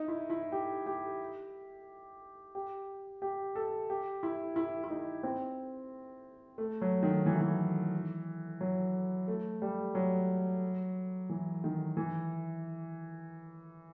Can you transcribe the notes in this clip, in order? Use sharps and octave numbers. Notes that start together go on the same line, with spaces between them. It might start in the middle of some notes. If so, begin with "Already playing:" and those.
Already playing: D#4
E4
E4
G4
G4
G4
G4
A4
G4
E4
E4
E4
D#4
C4
A3
F#3
D#3
E3
F#3
E3
F#3
A3
G3
F#3
E3
D#3
E3